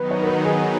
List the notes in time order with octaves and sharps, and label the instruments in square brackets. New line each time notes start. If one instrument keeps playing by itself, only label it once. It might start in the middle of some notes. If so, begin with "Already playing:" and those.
Already playing: [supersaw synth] D#3 F#3 B3 D#4 [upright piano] B4
[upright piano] C#5
A#4
B4
G#4